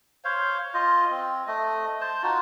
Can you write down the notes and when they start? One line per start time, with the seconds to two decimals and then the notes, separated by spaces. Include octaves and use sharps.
0.24 C5 C#5 F5
0.74 F4 D#5
1.10 C4
1.47 A3 D#5
2.01 C5 A5
2.22 D#4 F4 F#4